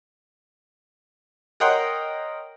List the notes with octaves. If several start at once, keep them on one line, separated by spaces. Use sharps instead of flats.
A#4 C#5 D#5 F#5 G5 C6